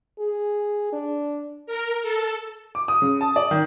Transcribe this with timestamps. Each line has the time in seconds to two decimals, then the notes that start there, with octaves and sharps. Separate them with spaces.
0.19 G#4
0.93 D4
1.66 A#4
2.02 A4
2.75 D6
2.88 D#6
3.02 C#3
3.21 A5
3.36 D5
3.51 D#3